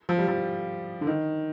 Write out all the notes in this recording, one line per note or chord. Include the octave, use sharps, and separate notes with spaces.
F3
G3
F3
D3
D#3